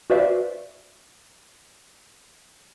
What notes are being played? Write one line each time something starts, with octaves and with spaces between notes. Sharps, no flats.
F#4 B4 C5 D5 E5 F5